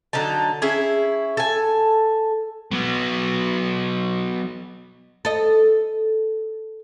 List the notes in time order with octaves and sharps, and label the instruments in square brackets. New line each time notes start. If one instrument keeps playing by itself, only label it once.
[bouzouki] D3 F#3 D#4 A5
C#4 E4 G#4
A4 G#5
[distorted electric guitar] F#3 B3
[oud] A4 D#5